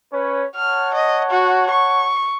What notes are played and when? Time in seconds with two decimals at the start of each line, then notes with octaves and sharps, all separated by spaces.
0.13 C#4 B4 C#5
0.56 C#5 F#5 A5 F6
0.94 D#5
1.31 F#4
1.71 C#6